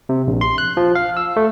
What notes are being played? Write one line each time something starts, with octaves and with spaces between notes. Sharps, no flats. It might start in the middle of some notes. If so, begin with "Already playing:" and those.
C3
A#1
C6
F#6
F3
F5
E6
A3